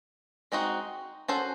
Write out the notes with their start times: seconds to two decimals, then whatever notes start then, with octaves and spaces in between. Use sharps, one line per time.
0.52 G#3 C4 D#4 F#4
1.28 C#4 F#4 A4 C5